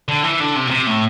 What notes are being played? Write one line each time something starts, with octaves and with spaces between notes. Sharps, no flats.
D3
E3
D3
C3
A#2
C3
A2